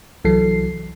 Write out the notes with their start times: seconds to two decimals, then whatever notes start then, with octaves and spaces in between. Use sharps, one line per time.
0.24 C2 E3 F#3 A4 C7